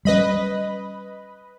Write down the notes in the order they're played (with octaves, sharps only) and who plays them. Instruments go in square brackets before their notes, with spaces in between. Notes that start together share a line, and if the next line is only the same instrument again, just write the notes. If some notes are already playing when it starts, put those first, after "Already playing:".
[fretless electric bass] G3 C#4 [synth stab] B4 D#5 B5